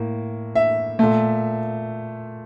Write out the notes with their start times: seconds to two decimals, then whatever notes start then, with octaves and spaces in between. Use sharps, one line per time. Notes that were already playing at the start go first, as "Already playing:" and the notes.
Already playing: A2 A#3
0.55 E5
0.99 A#2 A3